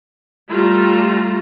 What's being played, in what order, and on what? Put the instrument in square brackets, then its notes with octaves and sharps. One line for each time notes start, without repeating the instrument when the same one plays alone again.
[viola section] G3 A3 F4 A#5